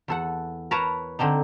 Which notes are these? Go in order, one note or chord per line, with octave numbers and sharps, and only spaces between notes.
E2 A4 F#5
A#4 B4 C#5 A5 A#5
D3 C4 D4 D#4